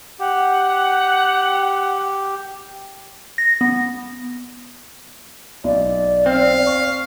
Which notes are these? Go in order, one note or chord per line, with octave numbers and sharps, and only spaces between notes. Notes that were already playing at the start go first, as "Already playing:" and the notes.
G4 F#5
A#6
B3
B1 D5
C4 F5
C#6